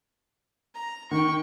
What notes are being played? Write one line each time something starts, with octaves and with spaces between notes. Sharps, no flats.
A#5
D#3 G5 C#6